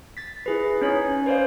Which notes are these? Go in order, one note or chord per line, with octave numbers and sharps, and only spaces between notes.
A6 B6
E4 G#4 B4
C#4 D#4 C#5
B4 C5 D5 F5